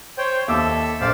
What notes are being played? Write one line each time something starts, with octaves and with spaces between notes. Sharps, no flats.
C5 C#5 G5
D#2 A4 E5 D6 E6
A#1 C5 D5 F5